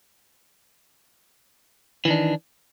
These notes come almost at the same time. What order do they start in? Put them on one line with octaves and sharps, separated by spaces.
E3 D#3 D4